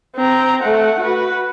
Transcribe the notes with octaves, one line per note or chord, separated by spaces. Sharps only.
C4 A#5
A3 F#5
F#4 B4